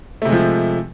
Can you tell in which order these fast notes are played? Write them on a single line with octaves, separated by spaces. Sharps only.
A3 C3 G#3 F3